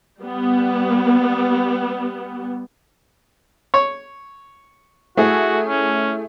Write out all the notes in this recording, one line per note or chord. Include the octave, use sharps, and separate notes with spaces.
G3 B3
C#5
A3 E4 F#4 G#4
C#4